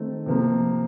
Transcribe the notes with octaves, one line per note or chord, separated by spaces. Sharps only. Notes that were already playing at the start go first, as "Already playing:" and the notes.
Already playing: D#3 A3 C4
C3 F3 A#3